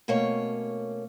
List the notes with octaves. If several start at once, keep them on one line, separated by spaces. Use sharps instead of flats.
B2 A3 A#3 C#4 C#5